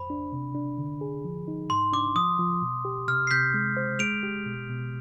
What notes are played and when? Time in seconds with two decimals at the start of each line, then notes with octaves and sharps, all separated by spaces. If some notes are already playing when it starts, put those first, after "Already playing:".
Already playing: F2 C5 B5
0.10 D4
0.32 C3
0.55 D4
0.78 D3
1.01 G#4
1.24 F3
1.48 D#4
1.70 G#2 C6
1.92 D4 D6
2.16 F3 D#6
2.39 F3
2.62 B2
2.85 G4
3.08 C3 F6
3.27 C7
3.31 C3 G6 B6
3.54 G#3
3.77 C5
3.99 G#3 D7 F7
4.23 G4
4.46 B2
4.69 B2